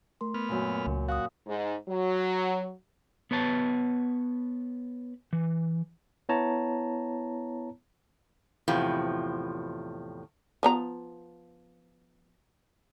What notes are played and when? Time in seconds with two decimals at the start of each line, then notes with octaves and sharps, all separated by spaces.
0.21 A3 A#4 C6
0.34 B3 F6
0.49 F#2 A#2
0.87 C#2
1.09 F#4 F5 C#6 D#6
1.47 G#2
1.89 F#3
3.31 B3 B4 C#5 A5
5.33 E3
6.29 B3 E4 C#5 A5 A#5
8.68 E2 A2 C3 F3
10.63 F3 B3 A#5